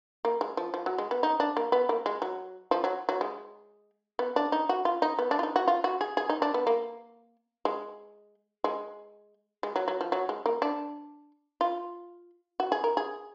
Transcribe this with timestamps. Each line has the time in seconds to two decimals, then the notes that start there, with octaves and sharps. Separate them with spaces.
0.25 A#3
0.41 G#3
0.57 F3
0.74 F3
0.86 F#3
0.98 G#3
1.11 B3
1.23 D#4
1.40 D4
1.57 A#3
1.72 B3
1.89 A#3
2.06 G#3
2.22 F#3
2.71 F3
2.84 F#3
3.09 F#3
3.21 G#3
4.19 B3
4.36 D4
4.52 D#4
4.69 F#4
4.85 F4
5.02 D#4
5.19 B3
5.31 D4
5.39 F4
5.43 D#4
5.56 F#4
5.68 F4
5.84 F#4
6.01 G#4
6.17 G#4
6.29 D#4
6.42 D4
6.54 B3
6.67 A#3
7.65 G#3
8.64 G#3
9.63 G#3
9.76 F#3
9.88 F#3
10.01 F3
10.12 F#3
10.29 G#3
10.46 A#3
10.62 D4
11.61 F4
12.60 F#4
12.72 G#4
12.84 A#4
12.97 G#4